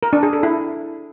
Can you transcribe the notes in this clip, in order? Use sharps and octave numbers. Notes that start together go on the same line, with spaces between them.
A#4
D4
G#4
A4
E4